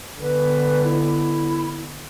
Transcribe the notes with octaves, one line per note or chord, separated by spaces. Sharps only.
D3 B3 B4
E4